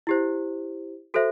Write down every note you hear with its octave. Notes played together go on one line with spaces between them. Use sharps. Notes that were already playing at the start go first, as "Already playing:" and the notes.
E4 G4 C5
F#4 A4 C5 E5